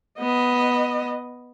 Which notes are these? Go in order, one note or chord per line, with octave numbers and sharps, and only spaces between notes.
B3 D#5